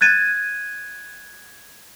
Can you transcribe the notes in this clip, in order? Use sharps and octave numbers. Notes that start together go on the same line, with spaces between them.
F#6 G#6 A6 D#7